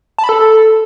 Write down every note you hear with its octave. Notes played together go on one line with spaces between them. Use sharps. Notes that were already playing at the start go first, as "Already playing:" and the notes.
A5
B5
A4